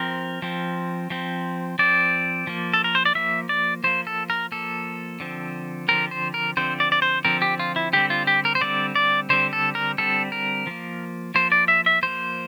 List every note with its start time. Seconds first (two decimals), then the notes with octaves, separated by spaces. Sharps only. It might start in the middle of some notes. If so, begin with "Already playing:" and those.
Already playing: F3 C4 A#4
0.42 F3 C4
1.10 F3 C4
1.79 F3 C4 D5
2.47 F3 A#3
2.73 A4
2.84 A#4
2.95 C5
3.05 D5
3.15 F3 A#3 E5
3.49 D5
3.84 F3 A#3 C5
4.07 A4
4.30 A#4
4.52 F3 A#3 A4
5.20 D3 F3 C4
5.88 D3 F3 C4 A#4
6.11 C5
6.34 A#4
6.57 D3 F3 C4 C5
6.80 D5
6.92 D5
7.02 C5
7.25 D3 F3 C4 A#4
7.42 G4
7.59 F4
7.76 E4
7.93 D3 G3 C4 G4
8.10 F4
8.27 G4
8.45 A#4
8.55 C5
8.61 D3 G3 C4 D5
8.95 D5
9.29 D3 G3 C4 C5
9.53 A4
9.75 A#4
9.98 D3 G3 C4 A4
10.32 A#4
10.67 F3 A#3
11.35 F3 A#3 C5
11.52 D5
11.68 E5
11.86 E5
12.03 F3 A#3 C5